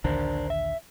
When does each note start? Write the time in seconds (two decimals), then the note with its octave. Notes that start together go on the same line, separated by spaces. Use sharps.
0.04 A#1 D#2 D3 D4 A#4 C5
0.50 E5